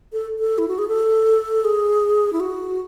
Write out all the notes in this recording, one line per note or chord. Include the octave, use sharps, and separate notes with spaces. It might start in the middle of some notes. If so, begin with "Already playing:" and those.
A4
A4
E4
F#4
G#4
A4
G#4
E4
F#4